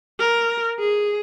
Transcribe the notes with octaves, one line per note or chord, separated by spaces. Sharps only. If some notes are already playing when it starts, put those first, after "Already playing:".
A#4
G#4